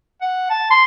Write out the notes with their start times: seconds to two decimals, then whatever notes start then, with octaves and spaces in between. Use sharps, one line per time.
0.21 F#5
0.50 A5
0.70 C6